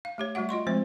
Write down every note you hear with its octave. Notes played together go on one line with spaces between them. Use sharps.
F5
A3 G4 C#5
G3 A3 F#4 E5 F#5
F4 D#5 C6 C#6
F3 G#3 A3 C4 C5